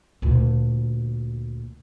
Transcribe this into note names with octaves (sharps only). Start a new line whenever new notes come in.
D2 A#2